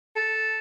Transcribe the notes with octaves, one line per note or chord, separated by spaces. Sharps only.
A4